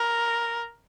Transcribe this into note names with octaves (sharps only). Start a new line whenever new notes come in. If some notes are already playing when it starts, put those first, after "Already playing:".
Already playing: A#4